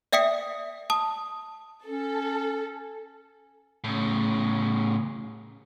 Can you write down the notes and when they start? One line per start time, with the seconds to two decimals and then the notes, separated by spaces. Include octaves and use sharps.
0.13 D5 E5 G5 D#6 B6 C#7
0.90 A5 D#6
1.86 C#4 A4
3.84 A2 C#3